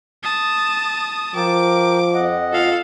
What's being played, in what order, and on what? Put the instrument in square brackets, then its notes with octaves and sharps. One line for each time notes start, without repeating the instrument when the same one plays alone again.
[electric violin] A5 D#6
[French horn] F3 [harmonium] A#4 G5 [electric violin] D6
[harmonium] F2 D#5 F#5
[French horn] F4 [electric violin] A4 F5